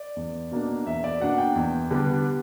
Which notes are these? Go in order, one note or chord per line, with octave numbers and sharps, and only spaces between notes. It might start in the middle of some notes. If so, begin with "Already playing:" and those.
Already playing: D5
E2
B2 A#3 D4
E2 E5
D5
B2 A#3 D4 F#5
G5
E2
D3 G3 B3 D4